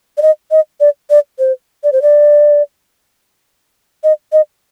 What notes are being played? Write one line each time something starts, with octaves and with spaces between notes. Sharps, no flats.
D5
D#5
D#5
D5
D5
C5
D5
C5
D5
D#5
D#5